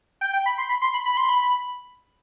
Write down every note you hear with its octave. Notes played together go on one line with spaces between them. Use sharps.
G5
G5
B5
C6
B5
C6
B5
B5
C6
B5